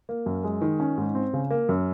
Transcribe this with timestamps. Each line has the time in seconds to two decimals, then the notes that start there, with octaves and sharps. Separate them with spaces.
0.09 A#3
0.26 F#2
0.44 G#3
0.62 D#3
0.80 C#4
0.98 G#2
1.15 C4
1.33 C#3
1.50 A#3
1.69 F#2